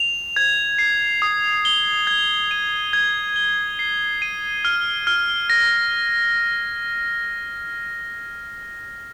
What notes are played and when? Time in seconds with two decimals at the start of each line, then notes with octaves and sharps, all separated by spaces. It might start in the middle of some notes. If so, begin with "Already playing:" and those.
Already playing: F7
0.36 G#6
0.78 C7
1.22 D#6
1.65 G7
2.07 G#6
2.51 D#7
2.93 G#6
3.36 G7
3.79 C7
4.22 D#7
4.65 F6
5.07 F6
5.50 A#6